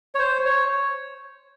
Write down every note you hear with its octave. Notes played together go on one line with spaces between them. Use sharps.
C#5
C5
C#5